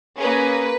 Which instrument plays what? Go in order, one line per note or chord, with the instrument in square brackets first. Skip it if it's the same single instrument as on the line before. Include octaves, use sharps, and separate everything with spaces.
[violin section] A#3 C#4 G#4 B4